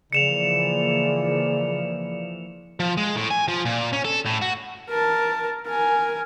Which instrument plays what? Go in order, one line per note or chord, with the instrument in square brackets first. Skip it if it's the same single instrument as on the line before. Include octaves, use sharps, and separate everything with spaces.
[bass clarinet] C#3 [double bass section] E3 F3 A#3 [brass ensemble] D5 [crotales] C#7 E7 F7
[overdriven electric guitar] F3
G#3
A2
G#5
F3
A#2
C#4
A4
A2
F#4
[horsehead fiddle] A#4 A5
A#4 G#5